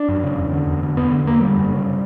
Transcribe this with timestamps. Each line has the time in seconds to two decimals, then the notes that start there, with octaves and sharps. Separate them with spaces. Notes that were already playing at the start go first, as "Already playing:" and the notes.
Already playing: D4
0.09 F#2
0.24 C#3
0.38 E2
0.53 D3
0.67 E2
0.83 D3
0.97 E2 B3
1.12 D3
1.27 E2 A#3
1.41 D3 G3
1.56 F#2
1.71 C#3